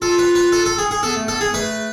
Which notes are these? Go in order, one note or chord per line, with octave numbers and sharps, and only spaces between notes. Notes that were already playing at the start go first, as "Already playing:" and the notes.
F4 A4
B4
B4
A4
A4
G#4
G#4
B3 A4
A3
B3 A4
G#4
A3 B4